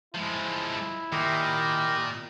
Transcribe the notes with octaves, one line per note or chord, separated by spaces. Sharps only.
F3 G#3 E4
A#2 D#3 G4 A#4 D#5